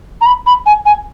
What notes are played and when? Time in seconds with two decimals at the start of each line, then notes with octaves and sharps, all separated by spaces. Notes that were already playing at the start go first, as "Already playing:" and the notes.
0.21 A#5
0.26 B5
0.46 B5
0.66 G#5
0.86 G#5